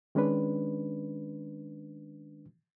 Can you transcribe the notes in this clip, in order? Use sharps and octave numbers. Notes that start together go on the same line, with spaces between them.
D#3 G#3 C#4 D4 B4